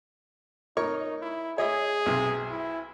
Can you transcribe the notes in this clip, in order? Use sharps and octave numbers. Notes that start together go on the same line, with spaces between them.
D#4 A#4 C#5 C#6
E4
G#4 C#5 D#5 E5
B1 C3
E4